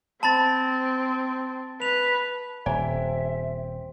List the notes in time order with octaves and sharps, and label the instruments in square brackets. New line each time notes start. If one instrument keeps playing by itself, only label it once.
[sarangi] C4 [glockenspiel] A5 B5 A6
[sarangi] B4 [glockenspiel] F7
[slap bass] D#1 [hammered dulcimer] C4 G4 [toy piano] D5 G#5 A#5 [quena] E5